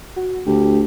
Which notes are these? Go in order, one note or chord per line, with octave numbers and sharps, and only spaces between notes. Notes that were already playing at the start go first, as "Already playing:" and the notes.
F#4
D2 G4